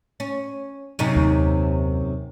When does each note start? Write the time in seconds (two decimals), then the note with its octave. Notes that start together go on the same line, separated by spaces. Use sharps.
0.20 C#4
0.99 F#2 C3 D#4
1.16 D#2